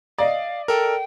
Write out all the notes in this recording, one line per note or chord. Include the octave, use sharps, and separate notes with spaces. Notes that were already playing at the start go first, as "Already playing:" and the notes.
D5 D#5 F5
A4 A#4 G5